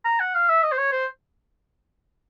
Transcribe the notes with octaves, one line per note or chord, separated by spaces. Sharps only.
A#5
F#5
F5
E5
D#5
C5
C#5
C5